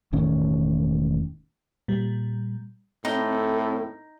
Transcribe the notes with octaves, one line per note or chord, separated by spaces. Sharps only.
E1 A2 D#3 C#4
A#2 G3
A2 C4 D#4 A4